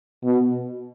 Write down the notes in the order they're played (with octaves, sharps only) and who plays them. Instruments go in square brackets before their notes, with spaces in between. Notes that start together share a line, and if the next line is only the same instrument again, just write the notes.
[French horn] B2